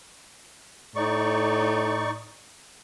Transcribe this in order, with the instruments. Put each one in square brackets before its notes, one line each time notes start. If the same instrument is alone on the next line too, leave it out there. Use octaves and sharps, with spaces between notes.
[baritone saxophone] A2 [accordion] D#4 D5 C#6